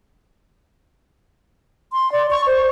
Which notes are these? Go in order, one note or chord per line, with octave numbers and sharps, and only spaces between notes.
C6
D5
C#6
C5